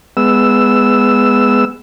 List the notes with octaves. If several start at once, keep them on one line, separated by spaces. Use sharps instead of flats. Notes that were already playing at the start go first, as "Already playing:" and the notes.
G#3 B3 E6